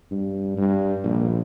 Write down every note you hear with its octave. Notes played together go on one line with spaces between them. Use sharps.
G2
G2
A#1